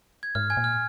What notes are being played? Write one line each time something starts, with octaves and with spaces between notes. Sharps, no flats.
G#6
G#2 F6
G#5 G#6
A#2
F6